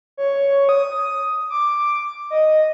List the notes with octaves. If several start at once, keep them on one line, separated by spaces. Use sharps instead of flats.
C#5
D#6
D6
D#5